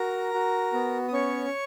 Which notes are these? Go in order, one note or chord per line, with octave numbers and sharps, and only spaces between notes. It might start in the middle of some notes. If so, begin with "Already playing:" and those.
Already playing: F#4 A#4 A#5
F#4
B3
D#6
C#4 C#5 C#6